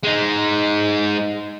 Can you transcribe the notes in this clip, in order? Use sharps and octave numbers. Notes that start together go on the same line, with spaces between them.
G#3 D#4